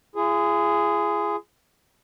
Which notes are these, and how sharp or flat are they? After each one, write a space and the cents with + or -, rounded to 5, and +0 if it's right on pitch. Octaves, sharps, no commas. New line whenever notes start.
F4 -45 G#4 +0